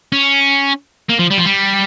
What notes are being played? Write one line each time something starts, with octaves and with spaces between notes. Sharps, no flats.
C#4
A#3
F3
G3
F3
G3